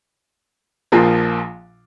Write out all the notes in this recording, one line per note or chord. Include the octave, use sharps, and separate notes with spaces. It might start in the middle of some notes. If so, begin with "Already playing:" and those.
A#1 A#2 F3 A#3 F4